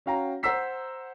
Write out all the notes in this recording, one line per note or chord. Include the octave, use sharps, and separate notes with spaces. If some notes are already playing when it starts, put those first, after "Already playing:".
C#4 F#4 F5 G5 A#5
C5 F#5 A#5 E6 B6 C7